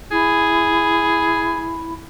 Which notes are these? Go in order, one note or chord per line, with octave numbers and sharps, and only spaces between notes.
E4 G#4